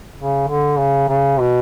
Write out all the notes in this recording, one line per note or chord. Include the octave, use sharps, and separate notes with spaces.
C#3
D3
C#3
C#3
B2